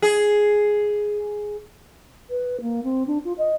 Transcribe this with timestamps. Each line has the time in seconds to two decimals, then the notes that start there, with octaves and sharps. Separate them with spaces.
0.02 G#4
2.30 B4
2.61 A#3
2.84 C4
3.07 D4
3.25 F4
3.38 D#5